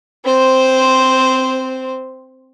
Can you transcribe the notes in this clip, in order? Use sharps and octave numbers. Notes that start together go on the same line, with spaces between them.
C4 C5